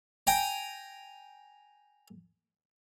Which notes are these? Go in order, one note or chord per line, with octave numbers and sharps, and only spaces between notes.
G5 G#5 A#5